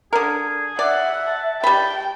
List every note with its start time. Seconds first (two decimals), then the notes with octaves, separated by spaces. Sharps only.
0.13 D3 G#4 A#4
0.79 D5 E5 F#5
1.27 A5
1.64 G3 G5 B5